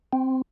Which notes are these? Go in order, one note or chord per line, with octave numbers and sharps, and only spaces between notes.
C4